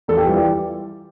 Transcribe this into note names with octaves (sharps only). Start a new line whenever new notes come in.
E2 A4
G4
E3 G3 F4
G4